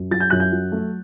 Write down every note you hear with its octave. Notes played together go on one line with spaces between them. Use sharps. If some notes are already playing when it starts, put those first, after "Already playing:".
Already playing: F#2
F#3 A6
G6
F#2 F#6
G6
F#3
A3